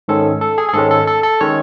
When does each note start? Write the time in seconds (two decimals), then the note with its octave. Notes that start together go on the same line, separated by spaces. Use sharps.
0.08 G#2 D#3 G#3 C#4 A4
0.41 A4
0.58 G#4
0.69 G#4
0.74 G#2 D#3 G#3 C#4 A4
0.91 A4
1.07 A4
1.23 A4
1.41 D#3 G#3 C#4 C#5